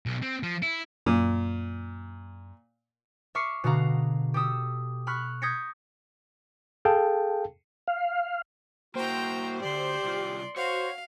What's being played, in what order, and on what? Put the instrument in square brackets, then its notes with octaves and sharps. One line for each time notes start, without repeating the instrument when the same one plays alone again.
[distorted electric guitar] B1
C4
F3
E4
[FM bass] F#2 [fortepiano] A#2
[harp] E5 C#6 D6 F6 C7 C#7
B2 D3 F#4 G#4 F5 A#5
G4 A4 D#6 E6
B5 C#6 F6 F#6 B6
D#6 G6 G#6 A#6 B6 C#7
[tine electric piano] G#4 A4 F5 G5 A5
[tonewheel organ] F5
[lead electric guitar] A#3 E4 [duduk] F#4 [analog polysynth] C5 [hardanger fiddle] G5 A#5
[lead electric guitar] D2 G#2 [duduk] G4 [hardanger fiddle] D5 C6
[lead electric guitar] C2 F4
[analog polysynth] F#4 [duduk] C5 [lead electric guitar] C#5 [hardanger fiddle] F5